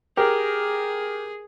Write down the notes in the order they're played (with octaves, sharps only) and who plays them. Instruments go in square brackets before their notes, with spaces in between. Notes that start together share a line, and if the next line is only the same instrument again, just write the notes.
[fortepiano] G4 A#4 [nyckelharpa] G#4